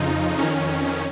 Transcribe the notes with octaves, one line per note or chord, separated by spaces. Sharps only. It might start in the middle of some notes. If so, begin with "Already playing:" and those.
Already playing: F2 C#3 F3 D#4
F2 D#3 C#4